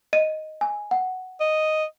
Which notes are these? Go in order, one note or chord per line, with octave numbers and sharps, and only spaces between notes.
D#5 D#7
G#5
F#5
D#5